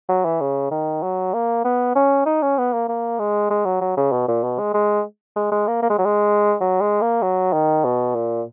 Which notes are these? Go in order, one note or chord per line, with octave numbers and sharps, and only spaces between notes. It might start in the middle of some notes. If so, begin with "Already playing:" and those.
F#3
E3
C#3
D#3
F#3
A#3
B3
C#4
D#4
C#4
B3
A#3
A#3
G#3
G#3
F#3
F#3
C#3
B2
A#2
B2
G#3
G#3
G#3
G#3
A#3
A#3
G#3
F#3
G#3
F#3
G#3
A#3
F#3
D#3
B2
A#2